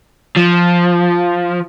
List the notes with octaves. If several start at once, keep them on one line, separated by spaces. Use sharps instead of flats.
F3